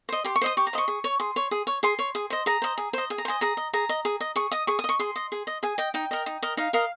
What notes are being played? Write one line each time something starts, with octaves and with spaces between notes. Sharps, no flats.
C5 D#5
G4 C6
C#6
C5 D#5 D#6
G4 C#6
A#5
C5 D#5 C#6
G#4
C#5
G#4 C6
C#5
G#4
C#5
G#4 C6
C#5
G#4
C5 D#5
G#4 A#5
C5 D#5
G#4
C5 D#5
G#4 G#5
A#5
C5 D#5 G#5
G#4 A#5
D#5
G#4 A#5
D#5
G#4
D#5
G#4 C#6
D#5 D#6
G#4 C#6
D#6
D#5 C#6
G#4 C6
D#5
G#4
D#5
G#4 G#5
D#5 G5
D#4 G5
A#4 D#5
D#4
A#4 D#5
D#4 F5
A#4 D#5 F5